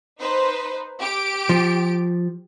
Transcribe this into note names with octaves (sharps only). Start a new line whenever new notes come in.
D#4 B4 C5
G4 D7
F3